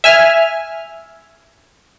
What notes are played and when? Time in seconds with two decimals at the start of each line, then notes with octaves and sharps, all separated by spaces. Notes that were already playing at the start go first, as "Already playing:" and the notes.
0.04 E5 G#5 F6